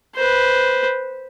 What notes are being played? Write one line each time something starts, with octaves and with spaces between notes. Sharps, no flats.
B4 C5